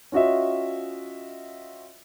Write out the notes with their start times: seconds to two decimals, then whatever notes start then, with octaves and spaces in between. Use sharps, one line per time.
0.12 C#4 F4 F#4 D#5 E5